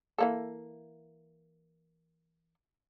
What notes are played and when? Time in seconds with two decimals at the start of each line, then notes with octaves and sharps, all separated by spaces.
0.18 E3 A#3 A4